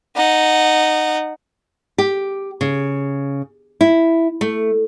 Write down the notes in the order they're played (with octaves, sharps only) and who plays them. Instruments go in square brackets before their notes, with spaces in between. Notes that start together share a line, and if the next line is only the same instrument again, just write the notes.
[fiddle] D#4 F#5
[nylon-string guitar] G4
C#3
E4
A3